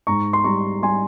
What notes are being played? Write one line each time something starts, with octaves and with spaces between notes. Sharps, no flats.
G#2 A#5 C#6
C6
G3 A#5 C#6
G3 G#5 C6